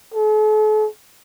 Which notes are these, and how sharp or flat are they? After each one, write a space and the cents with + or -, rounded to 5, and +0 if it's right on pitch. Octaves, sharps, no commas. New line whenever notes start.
A4 -45